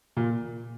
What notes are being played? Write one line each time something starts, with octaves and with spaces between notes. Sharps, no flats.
A#2